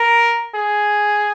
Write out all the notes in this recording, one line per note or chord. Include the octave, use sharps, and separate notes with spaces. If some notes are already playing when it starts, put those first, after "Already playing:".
Already playing: A#4
G#4